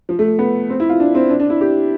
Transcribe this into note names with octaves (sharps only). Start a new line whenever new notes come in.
F3
A3
B3
C4
E4
F4
D4
C4
D4
D4
E4
G4